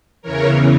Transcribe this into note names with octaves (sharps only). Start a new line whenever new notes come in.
E2 C#3 E3 A#4 C#5